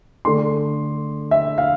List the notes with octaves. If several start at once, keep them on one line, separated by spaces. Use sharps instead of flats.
D3 A3 D4 C6
E5
F5